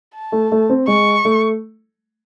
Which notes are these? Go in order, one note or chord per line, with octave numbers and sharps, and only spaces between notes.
A5
A3
A3
C4
G#3 C#6
A3